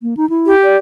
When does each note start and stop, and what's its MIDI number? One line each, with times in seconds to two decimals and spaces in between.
0.02 0.15 58
0.17 0.28 63
0.29 0.54 64
0.46 0.77 67
0.64 0.78 74